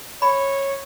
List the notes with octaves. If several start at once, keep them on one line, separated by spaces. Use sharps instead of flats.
C#5 B5